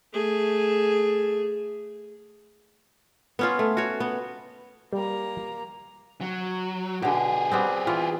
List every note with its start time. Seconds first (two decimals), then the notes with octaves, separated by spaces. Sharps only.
0.13 A3 G#4
3.39 B3 C#4 F4
3.59 A3
3.77 F#4 C#5
4.00 B3
4.93 G3 A#3 A#5
6.21 F#3
7.02 B2 D3 G4 G#4
7.51 G3 B3 C4
7.87 E3 F4